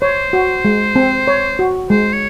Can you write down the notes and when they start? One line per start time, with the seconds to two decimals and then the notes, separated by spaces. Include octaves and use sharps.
0.02 C5 C#5
0.33 F#4
0.65 G#3
0.96 C4
1.28 C#5
1.59 F#4
1.90 G#3 C5
2.13 C#5